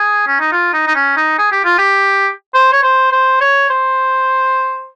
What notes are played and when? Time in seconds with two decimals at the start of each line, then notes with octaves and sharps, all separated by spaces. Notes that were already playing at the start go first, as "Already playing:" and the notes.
Already playing: G#4
0.27 C#4
0.40 D#4
0.52 F4
0.73 D#4
0.87 D#4
0.95 C#4
1.17 D#4
1.38 G#4
1.52 G4
1.65 F4
1.78 G4
2.54 C5
2.72 C#5
2.83 C5
3.12 C5
3.41 C#5
3.70 C5